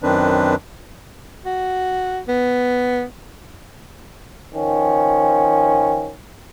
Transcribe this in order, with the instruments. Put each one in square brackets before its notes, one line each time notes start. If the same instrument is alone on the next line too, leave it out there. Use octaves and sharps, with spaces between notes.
[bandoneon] F#2 D#3 C4 D4 B4
[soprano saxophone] F#4
B3
[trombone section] D#3 F3 C#4